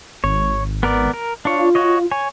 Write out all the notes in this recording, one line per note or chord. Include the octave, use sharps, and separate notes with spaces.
G#1 C#5
B3 A#4 D5
A#4
D4 F4 C#5
F#4 C#5 D#5
C#5 G#5